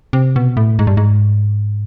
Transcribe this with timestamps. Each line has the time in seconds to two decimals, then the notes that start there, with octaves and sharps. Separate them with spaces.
0.13 C3
0.36 B2
0.57 A2
0.79 G#2
0.87 G2
0.97 G#2